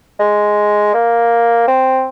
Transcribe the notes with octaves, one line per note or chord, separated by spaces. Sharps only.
G#3
A#3
C4